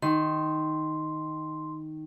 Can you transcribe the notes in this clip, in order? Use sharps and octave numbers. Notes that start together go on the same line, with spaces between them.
D#3 C6